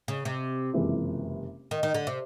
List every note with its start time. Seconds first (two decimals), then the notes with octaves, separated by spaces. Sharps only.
0.08 C#3
0.25 C3
0.74 F#1 F2 C3 E3 G#3
1.71 D#3
1.83 D#3
1.94 D3
2.07 C3